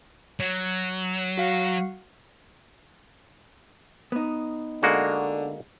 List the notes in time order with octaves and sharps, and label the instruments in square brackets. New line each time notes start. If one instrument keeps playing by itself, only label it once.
[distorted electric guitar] F#3
[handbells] F#4 F5 F#5
[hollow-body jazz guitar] B3 D#4
[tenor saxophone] D3 [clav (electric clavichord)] G#3 A#3 F#4